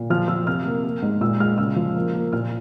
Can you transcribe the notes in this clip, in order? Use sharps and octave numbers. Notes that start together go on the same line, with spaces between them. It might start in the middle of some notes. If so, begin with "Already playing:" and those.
Already playing: A#2
F3 F6
F3 E6
C3 F6
A#3
A#3
G#2
A#2 E6
G#3 F6
C#3 E6
F3
A#3
A#3
A#2 F6